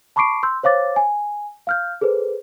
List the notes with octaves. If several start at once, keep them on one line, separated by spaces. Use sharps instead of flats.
A5 B5 C#6 D6 C7 D7
C6 E6 G6
C5 C#5 F5 D6 A6
G#5
F5 F6 G6
G#4 A4 B4 C5